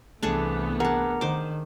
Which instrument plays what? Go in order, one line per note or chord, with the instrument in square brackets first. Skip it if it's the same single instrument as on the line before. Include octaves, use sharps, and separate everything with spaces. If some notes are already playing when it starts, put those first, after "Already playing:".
[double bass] C2 E3 [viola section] A3 B3 [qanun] D4 G#4 A4
[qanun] D4 G#4 [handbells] A#4 F#5 A#5
[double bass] D#3 [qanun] C5 D6